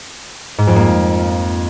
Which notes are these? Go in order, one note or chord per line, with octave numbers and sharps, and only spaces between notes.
G#2
F2
A#3